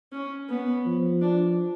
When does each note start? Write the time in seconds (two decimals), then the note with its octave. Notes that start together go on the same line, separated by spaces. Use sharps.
0.12 C#4
0.49 B3
0.86 F3
1.22 D4